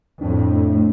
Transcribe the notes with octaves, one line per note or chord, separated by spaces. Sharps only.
F2 A2 D4
A3
A3